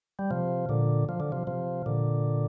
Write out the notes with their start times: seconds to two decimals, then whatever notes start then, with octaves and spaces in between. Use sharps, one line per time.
0.19 G3
0.31 C3 F3
0.69 A#2 D3
1.09 F3
1.20 D3
1.32 C3 F3
1.47 C3 F3
1.86 A#2 D3